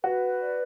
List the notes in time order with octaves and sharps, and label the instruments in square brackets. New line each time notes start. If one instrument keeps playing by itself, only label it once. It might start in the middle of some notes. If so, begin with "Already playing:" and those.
[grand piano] F#4 [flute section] B4
[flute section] D5